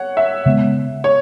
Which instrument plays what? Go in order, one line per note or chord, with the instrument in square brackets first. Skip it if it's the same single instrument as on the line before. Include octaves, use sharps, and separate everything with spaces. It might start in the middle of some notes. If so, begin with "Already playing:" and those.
Already playing: [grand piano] C#5 F#5
E5
[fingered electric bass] C#3 G#3 B3
[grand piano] C#5